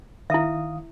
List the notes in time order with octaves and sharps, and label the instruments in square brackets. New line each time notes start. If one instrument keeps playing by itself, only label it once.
[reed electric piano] D#3 F5 D#6 [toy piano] E4 E5